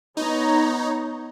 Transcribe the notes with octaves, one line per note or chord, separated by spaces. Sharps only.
B3 D#4 C#5 A#5